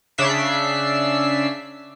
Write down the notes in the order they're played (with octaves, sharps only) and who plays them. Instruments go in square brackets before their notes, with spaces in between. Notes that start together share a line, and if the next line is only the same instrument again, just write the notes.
[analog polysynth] C#3 D4 E5 B6 C7